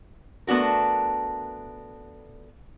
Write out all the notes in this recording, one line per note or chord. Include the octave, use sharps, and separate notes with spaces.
A3 B3 D4 F#4 A#4